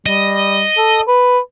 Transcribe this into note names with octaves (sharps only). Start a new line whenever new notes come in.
G3 D#5
A4
B4